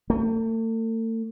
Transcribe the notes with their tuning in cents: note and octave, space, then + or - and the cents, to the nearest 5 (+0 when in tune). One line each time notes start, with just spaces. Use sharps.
A3 +40